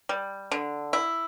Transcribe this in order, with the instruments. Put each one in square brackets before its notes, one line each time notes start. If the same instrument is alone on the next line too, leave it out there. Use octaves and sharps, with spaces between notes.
[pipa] G3
D3
E4